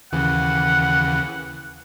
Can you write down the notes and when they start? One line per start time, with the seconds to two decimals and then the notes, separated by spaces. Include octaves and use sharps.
0.12 D#2 C#3 E3 F#5